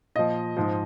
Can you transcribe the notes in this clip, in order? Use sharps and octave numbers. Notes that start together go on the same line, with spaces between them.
A#2 F3 D#5
G#2 F3